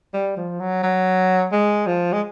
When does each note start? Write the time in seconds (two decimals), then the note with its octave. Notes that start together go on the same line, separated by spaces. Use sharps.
0.14 G3
0.37 F3
0.60 F#3
0.83 F#3
1.52 G#3
1.87 F3
2.13 G#3